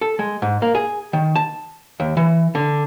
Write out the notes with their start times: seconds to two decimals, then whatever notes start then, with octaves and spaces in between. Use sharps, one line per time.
0.01 A4
0.19 G#3
0.42 G#2
0.62 A#3
0.75 G#4
1.13 D#3
1.36 A5
2.00 D#2
2.17 E3
2.55 D3